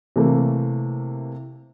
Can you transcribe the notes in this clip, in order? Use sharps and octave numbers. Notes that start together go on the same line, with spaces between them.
C3 E3 A3 A#3